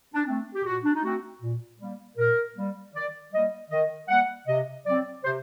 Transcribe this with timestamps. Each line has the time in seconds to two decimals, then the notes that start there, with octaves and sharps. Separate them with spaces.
0.14 D4
0.26 A3 C4
0.55 G4
0.65 A#2 F#4
0.84 D4
0.94 D#4
1.03 A3 C4 F#4
1.42 A#2
1.80 G3 A#3
2.17 A#2 A#4
2.56 G3 A#3
2.94 D#3 D5
3.32 G3 A#3 D#5
3.71 D#3 D#5
4.09 G3 A#3 F#5
4.48 C3 D#5
4.86 F#3 C4 D5
5.24 C3 C5